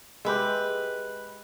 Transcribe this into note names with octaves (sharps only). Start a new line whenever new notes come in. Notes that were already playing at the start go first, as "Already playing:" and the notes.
G#3 G4 B4 E5